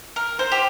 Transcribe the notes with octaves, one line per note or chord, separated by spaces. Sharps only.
A#4
C5
G4